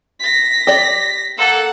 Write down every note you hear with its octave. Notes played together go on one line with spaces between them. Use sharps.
A#6 B6
G4 D5
A#3 A4 F#5